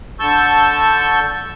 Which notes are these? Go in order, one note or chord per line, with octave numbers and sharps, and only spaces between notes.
D3 A5 C#6 E6 G6